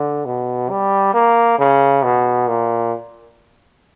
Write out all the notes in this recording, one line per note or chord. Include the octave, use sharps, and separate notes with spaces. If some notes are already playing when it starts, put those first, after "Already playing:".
Already playing: D3
B2
G3
A#3
C#3
B2
A#2